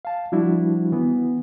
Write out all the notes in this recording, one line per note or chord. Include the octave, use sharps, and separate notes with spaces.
F5 A5
F3 G3 D4 E4 F#4
E3 B3